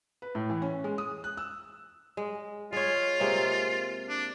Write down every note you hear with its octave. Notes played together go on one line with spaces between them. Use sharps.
B4
A2
E3
C#4
G#3
D#6
F#6
E6
G#3
G#3 F4 C#5
C3 G#3 A#3
D4